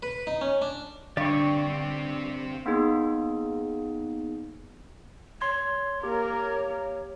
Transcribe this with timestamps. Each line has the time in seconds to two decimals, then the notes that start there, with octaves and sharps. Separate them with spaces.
0.03 B4
0.27 D#4
0.41 C#4
0.62 D4
1.17 G2 D3 C4 G4 D5 C#6
2.66 A#3 B3 D#4 G#4
5.41 C#5 C6 G#6
6.03 A#3 G4 A#4